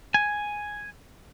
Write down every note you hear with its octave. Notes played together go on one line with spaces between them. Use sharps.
G#5